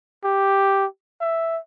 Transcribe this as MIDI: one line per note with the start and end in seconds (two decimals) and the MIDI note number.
0.24 0.86 67
1.21 1.59 76